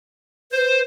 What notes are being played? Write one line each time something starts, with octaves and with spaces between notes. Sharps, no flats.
B4 C5